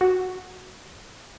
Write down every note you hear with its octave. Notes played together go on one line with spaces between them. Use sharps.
F#4